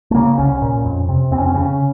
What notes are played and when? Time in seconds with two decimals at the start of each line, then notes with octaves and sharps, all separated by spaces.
0.11 A3
0.15 C#3 A#3
0.38 C2 C#4
0.62 A#2
0.84 F2
1.09 C3
1.31 F2 C4
1.38 C#4
1.46 C4
1.54 C#3 C#4